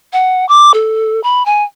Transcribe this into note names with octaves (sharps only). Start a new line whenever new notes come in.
F#5
D6
A4
B5
G#5